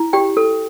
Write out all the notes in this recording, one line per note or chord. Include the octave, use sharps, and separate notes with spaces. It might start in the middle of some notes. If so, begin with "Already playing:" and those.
Already playing: E4
G4 G5
A4